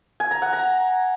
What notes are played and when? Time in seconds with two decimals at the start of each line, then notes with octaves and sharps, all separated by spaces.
0.20 G#5
0.31 A#5
0.42 F#5
0.53 A#5